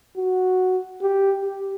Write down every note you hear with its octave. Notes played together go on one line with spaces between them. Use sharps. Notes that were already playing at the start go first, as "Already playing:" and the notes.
F#4
G4
G4